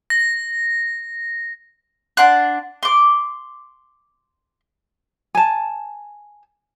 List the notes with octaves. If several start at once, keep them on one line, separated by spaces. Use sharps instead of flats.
A#6
D4 F#5 C6 F#6
C6 D6
G#5 A5